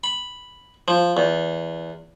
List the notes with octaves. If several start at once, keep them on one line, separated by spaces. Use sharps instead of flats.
B5
F3
E2